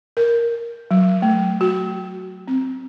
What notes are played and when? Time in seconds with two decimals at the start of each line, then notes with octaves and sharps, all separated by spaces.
0.17 A#4
0.91 F#3
1.22 A3
1.61 F#4
2.48 C4